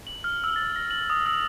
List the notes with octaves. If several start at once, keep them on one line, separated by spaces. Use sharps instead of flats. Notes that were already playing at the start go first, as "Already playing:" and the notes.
F#7
F6
E6
A6
A#6
F#7
D#6
E6